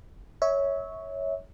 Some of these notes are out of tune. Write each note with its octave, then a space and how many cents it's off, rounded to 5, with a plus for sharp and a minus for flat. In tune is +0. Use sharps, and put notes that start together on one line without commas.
C#5 +5 E5 -25